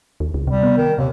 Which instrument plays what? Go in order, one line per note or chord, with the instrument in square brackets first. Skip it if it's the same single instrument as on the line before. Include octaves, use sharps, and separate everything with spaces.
[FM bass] D#2
C#2
[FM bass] C3 [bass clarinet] G3
[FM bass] B3
[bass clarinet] D#3
[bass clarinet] D#2 [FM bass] C3